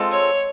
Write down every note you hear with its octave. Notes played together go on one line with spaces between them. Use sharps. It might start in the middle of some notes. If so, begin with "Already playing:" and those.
Already playing: G#3 C4 F4 A4
C#5